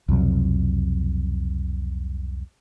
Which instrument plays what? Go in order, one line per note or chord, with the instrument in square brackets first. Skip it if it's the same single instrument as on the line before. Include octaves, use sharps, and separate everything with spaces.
[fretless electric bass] C2 F2 B2 F#3